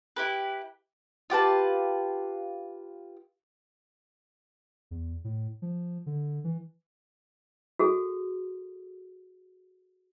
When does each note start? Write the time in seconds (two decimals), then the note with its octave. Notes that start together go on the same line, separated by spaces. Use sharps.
0.17 E4 G4 B4
1.30 F4 G4 B4 A5
4.91 E2
5.24 A2
5.62 F3
6.06 D3
6.44 E3
7.79 F#4 G#4 A4